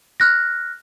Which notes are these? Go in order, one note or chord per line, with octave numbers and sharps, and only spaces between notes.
F6 F#6 A#6